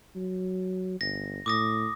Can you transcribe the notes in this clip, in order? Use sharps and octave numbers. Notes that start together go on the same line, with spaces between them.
F#3
G1 A#6
A2 D6 D#6 A#6